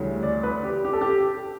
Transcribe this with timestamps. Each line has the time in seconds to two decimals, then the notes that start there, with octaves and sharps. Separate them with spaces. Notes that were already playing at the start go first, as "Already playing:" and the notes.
Already playing: D2 C#3 E3 G3 C#4
0.23 D5
0.43 B4
0.63 G4
0.84 G4
0.93 A4
1.01 G4